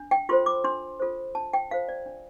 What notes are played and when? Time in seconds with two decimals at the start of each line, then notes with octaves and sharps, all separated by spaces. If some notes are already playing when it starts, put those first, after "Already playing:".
Already playing: D4
0.11 G5
0.29 F4 A4 C5 C6
0.46 D6
0.64 D4 C6
1.00 F4 A4 C5
1.35 D4 A5
1.53 G5
1.71 F4 A4 C5 F5
1.89 D5
2.06 D4